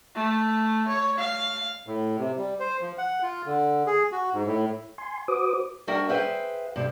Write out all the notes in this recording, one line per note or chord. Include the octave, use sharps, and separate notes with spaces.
A3
C#5
F5
A2
C3
G3
C5
F3
F#5
F4
D3
G#4
F#4
G#2
A2
G#5 C6
F#4 B4 C5 D6 D#6
G3 D4 F#4 A#4 E5 G5
G#4 B4 C5 E5 F5 G5
G2 C3